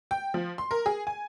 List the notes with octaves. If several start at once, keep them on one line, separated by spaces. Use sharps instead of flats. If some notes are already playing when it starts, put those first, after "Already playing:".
G5
F3
C6
A#4
G#4
G#5